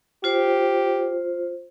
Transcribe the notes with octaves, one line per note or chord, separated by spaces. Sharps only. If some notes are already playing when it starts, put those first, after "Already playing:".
F4 G4 C5